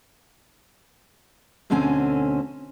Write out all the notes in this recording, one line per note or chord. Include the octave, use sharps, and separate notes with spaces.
D2 B2 D3 C4 C#4 G#5